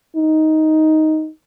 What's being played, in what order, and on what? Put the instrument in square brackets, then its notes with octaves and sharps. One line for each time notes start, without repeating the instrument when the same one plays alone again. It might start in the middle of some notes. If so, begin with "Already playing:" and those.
[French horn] D#4